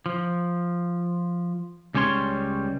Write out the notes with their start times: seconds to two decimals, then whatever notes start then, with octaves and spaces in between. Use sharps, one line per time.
0.06 F3
1.94 C#2 G3 C#4 C#5 C6